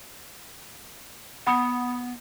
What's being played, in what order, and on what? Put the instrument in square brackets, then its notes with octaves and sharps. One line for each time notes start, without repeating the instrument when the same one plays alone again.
[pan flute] B3 [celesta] F#5 B5 D#6